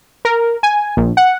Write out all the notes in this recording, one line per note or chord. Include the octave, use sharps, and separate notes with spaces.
A#4
G#5
A#1
F#5